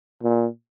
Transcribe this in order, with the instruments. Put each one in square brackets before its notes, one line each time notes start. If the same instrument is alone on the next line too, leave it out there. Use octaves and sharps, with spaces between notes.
[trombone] A#2